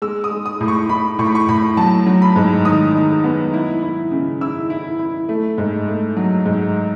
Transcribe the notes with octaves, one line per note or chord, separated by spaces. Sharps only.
G#3 E6
D#6
G#3
D#6
A2
C#6
A2 B5
A2 C#6
B5
C#6
A2 B5
F#3 A5
F#3
B5
G#2
D#3 D#6
D#3
B3
E4
E4
C#3
E4 E6
E4
E4
A3
G#2
A3
F#3
G#2